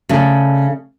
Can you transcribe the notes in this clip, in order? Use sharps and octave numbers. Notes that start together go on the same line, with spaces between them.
C#3 A3 D4